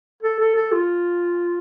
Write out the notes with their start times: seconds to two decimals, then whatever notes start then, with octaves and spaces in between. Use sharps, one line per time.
0.23 A4
0.40 A4
0.55 A4
0.72 F4